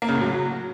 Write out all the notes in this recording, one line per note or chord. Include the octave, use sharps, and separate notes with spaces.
A#3
C#3
A2
F#3